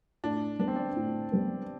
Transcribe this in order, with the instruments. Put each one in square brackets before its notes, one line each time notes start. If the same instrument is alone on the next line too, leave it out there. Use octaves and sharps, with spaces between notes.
[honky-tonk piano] A2 [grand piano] D4
[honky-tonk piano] G3 B3 [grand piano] D4
[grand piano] C4
D4
[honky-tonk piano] A2
G3 B3